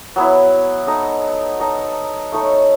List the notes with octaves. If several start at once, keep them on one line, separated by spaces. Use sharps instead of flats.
F#3 B3 E4
D#4 A4 D#5
D#4 A4 D#5
A3 D#4 A4 C#5